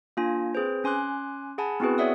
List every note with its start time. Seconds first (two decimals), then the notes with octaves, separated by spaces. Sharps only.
0.17 A#3 D4 F4 G#5 A#6
0.55 C4 G#4 B4 C5
0.84 C#4 G#5 C6 D6 F#6
1.58 G#4 F#5 G#5 A5 B5
1.80 B3 C4 E4 F#4 G#4 B4
1.98 C#5 D5 E5 F#5 D#6